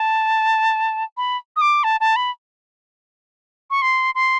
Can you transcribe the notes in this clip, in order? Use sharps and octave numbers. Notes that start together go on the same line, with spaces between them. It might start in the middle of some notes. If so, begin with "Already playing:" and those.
Already playing: A5
B5
D#6
D6
A5
A5
B5
C#6
C6
C6